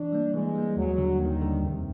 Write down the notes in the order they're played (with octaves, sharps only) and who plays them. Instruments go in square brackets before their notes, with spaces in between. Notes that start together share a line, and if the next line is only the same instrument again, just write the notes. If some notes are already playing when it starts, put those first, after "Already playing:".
Already playing: [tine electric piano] E3 [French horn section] D4
[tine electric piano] G3 A#3
[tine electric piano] E3 [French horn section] G#3
[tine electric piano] G3 A#3
[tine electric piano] D#2 [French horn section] F#3
[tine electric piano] D3 G3
[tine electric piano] D#2 [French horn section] D#3
[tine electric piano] D3 G3
[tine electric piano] F2 [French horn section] C3